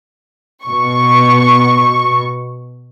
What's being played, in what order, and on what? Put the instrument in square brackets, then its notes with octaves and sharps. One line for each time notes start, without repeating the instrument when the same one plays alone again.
[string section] B2 C#6